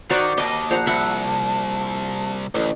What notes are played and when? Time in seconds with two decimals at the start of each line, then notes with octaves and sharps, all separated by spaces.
0.10 D#3 D#4 F#4 C5 D5
0.38 D#2 D#5 A5 D6
0.71 A#1 C5 F#5 A#5
0.87 C2 E5 F#5 B5
2.55 A1 D2